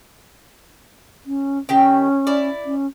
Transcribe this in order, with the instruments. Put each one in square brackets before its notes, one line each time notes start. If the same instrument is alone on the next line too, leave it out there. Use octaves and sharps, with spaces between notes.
[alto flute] C#4
[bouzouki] D#3 G4 G5 [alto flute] C#4
[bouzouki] E4 D5
[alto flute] C#4